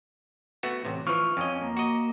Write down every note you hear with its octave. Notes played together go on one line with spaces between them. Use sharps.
A3 B3 F#4
A1 C3
E3 F3 C#6 F6
F2 C#4 D#5 G#5
A#3
F#4 D#5